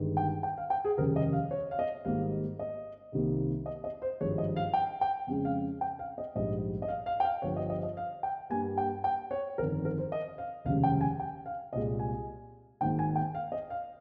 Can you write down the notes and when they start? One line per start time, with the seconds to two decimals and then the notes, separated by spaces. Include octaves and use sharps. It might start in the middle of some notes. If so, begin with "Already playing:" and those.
Already playing: G1 G2 D#3 G#3
0.17 G5
0.43 G5
0.58 F5
0.70 G5
0.85 G#4
0.97 F1 D#2 C#3 G3 A#4
1.16 D#5
1.33 F5
1.51 C#5
1.71 F5
1.79 D#5
2.05 G#1 G#2 G3 A#3 F5
2.59 D#5
3.12 C2 C3 D#3 G3 A#3
3.66 D#5
3.84 D#5
4.02 C5
4.20 G#1 G2 F3 G#3 C#5
4.38 D#5
4.56 F5
4.73 G5
5.01 G5
5.27 F2 C#3 G#3
5.45 F5
5.81 G5
5.99 F5
6.18 D#5
6.35 A#1 G#2 G3 D#5
6.82 D#5
6.88 F5
7.06 F5
7.20 G5
7.25 F5
7.42 G1 G2 F3 C#5
7.56 D#5
7.70 D#5
7.83 D#5
7.97 F5
8.23 G5
8.50 G2 G3 A#3 G#5
8.78 G5
9.04 G5
9.31 C#5
9.58 G1 F2 D#3 A#4
9.85 A#4
9.98 C5
10.12 D#5
10.38 F5
10.65 F1 D#2 C#3 G#3 F5
10.83 G5
11.01 G#5
11.20 G5
11.46 F5
11.73 C2 A#2 G#3 D#5
11.99 G#5
12.81 G#1 G#2 D#3 A#3 G5
12.99 G#5
13.16 G5
13.35 F5
13.52 D#5
13.70 F5